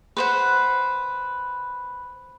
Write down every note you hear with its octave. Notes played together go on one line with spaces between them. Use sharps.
B4 C5 F#5